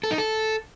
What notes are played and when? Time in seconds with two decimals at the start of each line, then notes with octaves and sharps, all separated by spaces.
0.03 A4
0.11 D#4
0.18 A4